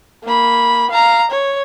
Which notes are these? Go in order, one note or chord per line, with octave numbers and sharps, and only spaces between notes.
A#3 B5
F5 A#5
C#5